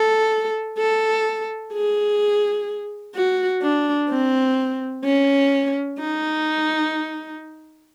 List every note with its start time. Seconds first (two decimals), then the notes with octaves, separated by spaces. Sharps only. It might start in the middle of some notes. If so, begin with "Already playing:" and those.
Already playing: A4
0.78 A4
1.73 G#4
3.15 F#4
3.62 D4
4.10 C4
5.04 C#4
5.99 D#4